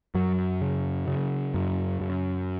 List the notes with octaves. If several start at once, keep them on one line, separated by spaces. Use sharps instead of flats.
F#2 F#3
C#3
C#3
F#2
F#2